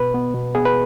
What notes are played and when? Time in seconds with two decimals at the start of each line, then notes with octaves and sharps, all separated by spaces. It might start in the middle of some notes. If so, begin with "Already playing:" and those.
Already playing: B2 B4
0.14 B3
0.35 B2
0.55 B3 G#4
0.65 B4